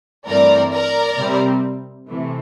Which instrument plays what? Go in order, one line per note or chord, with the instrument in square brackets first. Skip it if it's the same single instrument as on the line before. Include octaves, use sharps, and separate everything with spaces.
[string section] G2 E3 A3 C4 A#4 D5
A#4 D5
C3 G3 C4
C3 E3 A3